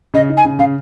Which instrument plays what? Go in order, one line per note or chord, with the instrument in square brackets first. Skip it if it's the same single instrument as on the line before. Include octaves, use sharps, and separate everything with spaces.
[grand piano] C#3 [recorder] D#5
[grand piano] D#4
[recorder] G#5
[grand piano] C#3
[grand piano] C#3 [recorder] F5